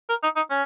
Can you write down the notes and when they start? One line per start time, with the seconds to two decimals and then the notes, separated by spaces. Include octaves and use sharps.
0.09 A#4
0.23 D#4
0.36 D#4
0.50 C#4